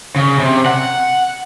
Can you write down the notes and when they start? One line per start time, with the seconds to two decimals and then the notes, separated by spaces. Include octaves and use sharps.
0.16 C#3
0.39 C3
0.66 F#5